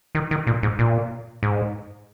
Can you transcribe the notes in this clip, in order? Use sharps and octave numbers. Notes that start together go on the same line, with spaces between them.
D#3
D#3
A#2
G#2
A#2
G#2